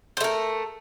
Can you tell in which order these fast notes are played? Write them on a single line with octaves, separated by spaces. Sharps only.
C5 A3 A#4